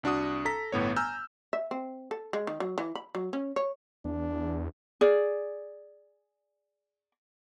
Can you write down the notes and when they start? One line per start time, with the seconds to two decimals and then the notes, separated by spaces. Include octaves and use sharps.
0.03 C2 D4 F#4 D#6
0.45 A4 A#5 B6
0.72 G1 A2 B3 C#5
0.96 G#5 A#5 E6 F6 G6
1.53 E5
1.71 C4
2.11 A4
2.33 G#3
2.47 D#3
2.60 F#3
2.78 E3
2.95 B5
3.15 F#3
3.33 C#4
3.56 C#5
4.05 E2 D4
5.01 G#4 D5